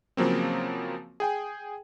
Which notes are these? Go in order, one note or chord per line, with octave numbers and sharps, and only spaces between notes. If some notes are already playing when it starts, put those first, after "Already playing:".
C#3 F3 F#3 A#3 C4
G#4 G5 G#5